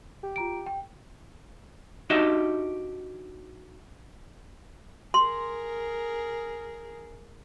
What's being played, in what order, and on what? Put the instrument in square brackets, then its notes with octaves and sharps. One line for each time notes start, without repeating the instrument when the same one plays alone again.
[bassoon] G4
[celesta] F4 A#5 D7
G5
[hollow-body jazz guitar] D4 D#4 F#4 G4 D#5 E5
[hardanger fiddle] G#4 A#4 [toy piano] C6